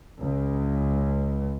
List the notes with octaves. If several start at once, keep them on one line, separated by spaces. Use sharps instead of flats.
C#2